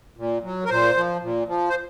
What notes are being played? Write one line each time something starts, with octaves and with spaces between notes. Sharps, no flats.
A#2
F#3
A#4
A#2 C5
F3
A#2
F3
C5